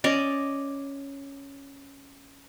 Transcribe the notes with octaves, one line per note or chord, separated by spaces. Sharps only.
C#4 D5 D#5